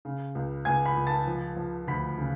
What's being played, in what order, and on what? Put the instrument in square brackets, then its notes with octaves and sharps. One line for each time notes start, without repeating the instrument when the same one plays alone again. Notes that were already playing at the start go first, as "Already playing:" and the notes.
[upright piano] C#3
C#2
C#2 G#5 G#6
B5 B6
C#2
A5 A6
F3
F3
D2 B5 B6
C#3